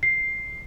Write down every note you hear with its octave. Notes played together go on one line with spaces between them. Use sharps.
C7